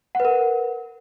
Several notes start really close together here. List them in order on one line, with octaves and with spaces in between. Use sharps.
F#5 B4 A#4